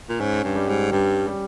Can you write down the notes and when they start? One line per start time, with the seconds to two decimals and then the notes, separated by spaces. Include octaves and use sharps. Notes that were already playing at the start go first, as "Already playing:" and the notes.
0.09 A#2
0.20 G#2 C#4
0.44 G2
0.56 G3
0.69 G#2
0.92 G2 G3
1.27 G3